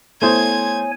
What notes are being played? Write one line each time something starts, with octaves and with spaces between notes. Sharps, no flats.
A3 B3 E4 C5 C#5 G#5 D#6 G#6